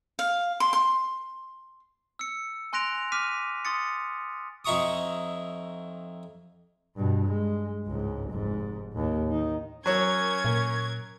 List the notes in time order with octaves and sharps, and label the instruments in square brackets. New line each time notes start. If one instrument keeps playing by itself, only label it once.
[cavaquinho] F5
C6
C6
[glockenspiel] E6 C#7
G#5 C6 F#6 A#6 D7 F7
D6 F6 B6 D#7
C6 D#6 A6 C#7
[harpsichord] F2 D#4 E4 A#5 C#6 D#6
[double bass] G2 B2
G#3
C#2 G#2
F1 G#2
D#2 A2
D#3 D#4
[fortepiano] F#3 C#5 [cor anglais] C#4 [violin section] A#4 G#6
[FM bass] A#2